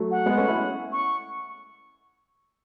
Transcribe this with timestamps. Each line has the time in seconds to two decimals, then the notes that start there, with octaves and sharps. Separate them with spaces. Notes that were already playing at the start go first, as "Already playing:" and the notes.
Already playing: F#3 A3
0.11 F#5
0.26 G#3 B3
0.37 A3 C#4
0.48 C#4 E4
0.92 C#6